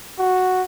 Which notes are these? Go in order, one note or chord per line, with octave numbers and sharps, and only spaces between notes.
F#4